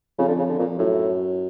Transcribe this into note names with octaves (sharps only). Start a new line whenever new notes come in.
F2 C#3
D3
C#3
D3
F2 A#2
F#2 A2